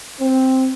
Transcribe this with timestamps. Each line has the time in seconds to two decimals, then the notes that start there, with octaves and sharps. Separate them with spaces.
0.19 C4